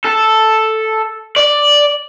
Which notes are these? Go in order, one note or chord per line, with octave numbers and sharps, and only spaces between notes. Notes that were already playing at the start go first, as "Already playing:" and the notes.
A4
D5